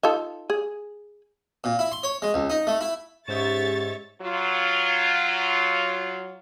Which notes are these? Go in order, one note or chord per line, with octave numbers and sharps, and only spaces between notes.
D#4 F4 A4
G#4
A#2
E4
C6
C#5
G#3
C#2
D#4
A3
E4
G#2 C#4 G4 C#5 E5 C#6 A6
F#3 F4